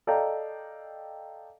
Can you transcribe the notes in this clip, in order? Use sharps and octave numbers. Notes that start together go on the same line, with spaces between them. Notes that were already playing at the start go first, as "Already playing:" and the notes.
A4 D5 D#5 F5 G5 A#5